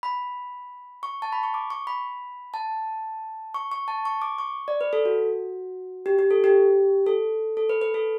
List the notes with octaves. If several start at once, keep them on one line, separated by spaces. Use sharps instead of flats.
B5
C#6
A5
B5
C#6
D6
C#6
B5
A5
C#6
C#6
A5
C#6
D6
C#6
D5
B4
A4
F#4
G4
G4
A4
G4
A4
A4
B4
B4
A4